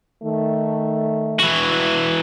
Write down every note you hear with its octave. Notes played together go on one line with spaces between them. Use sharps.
D#3 A3
E3 F#4